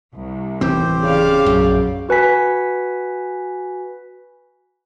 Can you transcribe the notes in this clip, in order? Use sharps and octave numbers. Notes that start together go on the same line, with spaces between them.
C2
D1 D#2 E3 C4 G4 C5
C#3 C#5 D5 F5
A#1 F#2
F#4 B4 G#5 B6